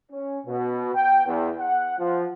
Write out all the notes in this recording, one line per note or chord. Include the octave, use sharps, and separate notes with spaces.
C#4
B2
G5
E2
F#5
F3